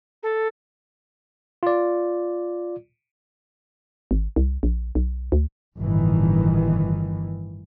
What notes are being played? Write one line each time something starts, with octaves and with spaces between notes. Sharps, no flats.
A4
F4 D5
G#1
C2
A#1
B1
D2
G1 A2 D#3 E3